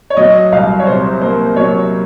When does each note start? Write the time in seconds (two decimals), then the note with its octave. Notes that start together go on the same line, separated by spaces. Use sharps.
0.10 C#5
0.17 F#3 D#5
0.52 C2 F5
0.80 C#5
0.87 C3 C5
1.22 A#3 C5
1.56 F#3 C#5